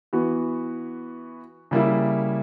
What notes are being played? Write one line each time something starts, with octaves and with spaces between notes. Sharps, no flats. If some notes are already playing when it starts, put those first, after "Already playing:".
E3 B3 F#4
C#3 G3 A#3 E4